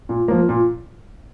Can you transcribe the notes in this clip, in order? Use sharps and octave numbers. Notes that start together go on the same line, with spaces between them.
A#2
F3 A#3
A#2